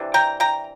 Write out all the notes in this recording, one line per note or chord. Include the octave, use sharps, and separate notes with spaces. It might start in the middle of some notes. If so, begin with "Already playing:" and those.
Already playing: C3 E3 D4
G5 A#5
G5 A#5